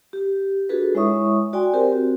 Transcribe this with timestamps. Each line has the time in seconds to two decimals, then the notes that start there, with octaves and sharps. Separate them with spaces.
0.13 G4
0.69 D4 F4 F#4 G#4 A4 B4
0.95 G#3 E4 C#5 E5 C#6 D#6
1.53 F#4 D5 G5 G#5 C6
1.73 C4 G4 A#4 C5
1.92 C4 F#4